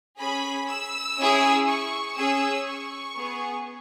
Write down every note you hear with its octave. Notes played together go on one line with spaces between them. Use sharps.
C#4 G#4 B5
E6
C#4 E4 G#4
C#6
C#4 G#4 E6
C#6
B3 G#4